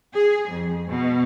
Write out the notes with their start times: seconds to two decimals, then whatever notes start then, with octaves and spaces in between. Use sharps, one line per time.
0.14 G#4
0.49 F2
0.86 B2